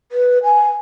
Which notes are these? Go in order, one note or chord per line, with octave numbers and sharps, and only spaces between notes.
B4
G#5